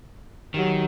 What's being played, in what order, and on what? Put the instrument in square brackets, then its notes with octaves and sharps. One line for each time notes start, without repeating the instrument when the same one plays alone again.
[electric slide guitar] D#3 [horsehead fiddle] F#3 G4